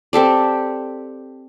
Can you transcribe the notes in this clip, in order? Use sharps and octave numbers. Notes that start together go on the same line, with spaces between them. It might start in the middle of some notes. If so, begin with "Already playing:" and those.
C4 G4 A4 D5